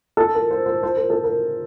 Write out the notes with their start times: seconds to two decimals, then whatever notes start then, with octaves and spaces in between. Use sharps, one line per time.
0.17 A4
0.34 A#4
0.51 C5
0.66 C5
0.83 C5
0.96 A#4
1.10 A4
1.24 A#4